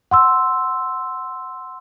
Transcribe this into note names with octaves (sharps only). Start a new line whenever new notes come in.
F#5 C6 E6